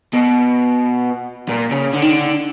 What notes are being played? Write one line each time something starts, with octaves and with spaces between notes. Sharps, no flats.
B2
A#2
C#3
D3
D#3
D3